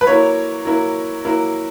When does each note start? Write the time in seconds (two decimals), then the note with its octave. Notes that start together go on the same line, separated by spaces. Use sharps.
0.01 B4
0.07 F#3 A#3 E4 C#5
0.65 F#3 A#3 E4
1.25 F#3 A#3 E4